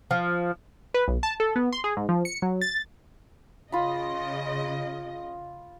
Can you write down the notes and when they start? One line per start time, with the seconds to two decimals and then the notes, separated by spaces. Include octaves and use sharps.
0.11 F3
0.94 B4
1.08 B1
1.23 A5
1.40 A4
1.56 B3
1.73 C6
1.84 G#4
1.97 G#2
2.09 F3
2.25 C#7
2.42 F#3
2.61 A6
3.72 C#3 F4 D#5 B5